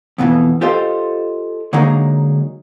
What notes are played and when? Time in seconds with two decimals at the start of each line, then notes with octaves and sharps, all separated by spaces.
0.18 F2 B2 D3 E3
0.61 F4 G4 A4 C5 D#5 F5
1.73 D3 F#3 G#3 A#3 D#4